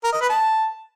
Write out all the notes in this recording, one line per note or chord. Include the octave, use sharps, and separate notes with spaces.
A#4
D#5
B4
A5